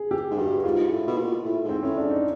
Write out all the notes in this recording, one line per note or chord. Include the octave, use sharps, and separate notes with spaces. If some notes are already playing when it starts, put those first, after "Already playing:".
Already playing: G#4
G4
G#2
G2 F#4
F#4
G#2 F4
G#2
A2
B2
A#2
A2
G#2 C4
A2 C#4
D4
G#2
D#4